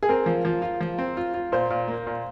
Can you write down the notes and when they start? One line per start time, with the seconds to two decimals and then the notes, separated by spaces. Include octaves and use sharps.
0.03 G#4
0.09 C4 A#4
0.26 F3
0.45 F3
0.62 F4
0.81 F3
0.99 C4
1.17 F4
1.34 F4
1.52 A#2 C5
1.70 A#2
1.88 A#3
2.07 A#2